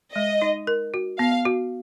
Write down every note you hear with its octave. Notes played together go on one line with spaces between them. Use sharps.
G#3 D#5
D#4
A#4
F#4
B3 F5
F#4